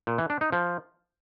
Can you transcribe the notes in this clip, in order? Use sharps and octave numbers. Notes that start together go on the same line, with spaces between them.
A#2
E3
D4
D#4
F3